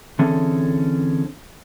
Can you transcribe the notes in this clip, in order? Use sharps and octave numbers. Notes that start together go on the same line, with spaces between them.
D3 E3 C4 C#4 G#4 A4